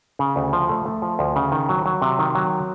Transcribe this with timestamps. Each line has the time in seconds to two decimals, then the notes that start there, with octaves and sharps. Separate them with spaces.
0.19 C#3
0.36 D2
0.53 F3
0.69 A3
0.85 A3
1.02 F3
1.19 D2
1.36 C#3
1.52 D#3
1.69 F#3
1.86 F#3
2.02 C3
2.19 D#3
2.35 F#3